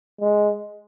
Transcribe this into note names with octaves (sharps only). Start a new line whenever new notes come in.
G#3